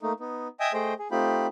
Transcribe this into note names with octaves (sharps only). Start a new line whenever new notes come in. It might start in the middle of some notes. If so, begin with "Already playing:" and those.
A3 A#3 D#4
B3 D#4
D#5 E5 G5 G#5 D#6
A3 G#4 C5 D#5 G5
G#4
A3 C4 D#4 F4 G4 B5